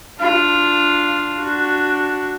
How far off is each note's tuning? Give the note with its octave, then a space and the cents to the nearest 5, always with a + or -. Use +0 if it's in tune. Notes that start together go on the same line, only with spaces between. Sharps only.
D4 +0 F4 +0
D4 +0 F#4 +0